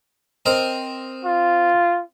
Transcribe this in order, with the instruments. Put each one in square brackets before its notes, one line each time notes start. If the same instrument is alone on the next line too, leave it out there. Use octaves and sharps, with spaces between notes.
[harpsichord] C4 A#4 D#5
[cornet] F4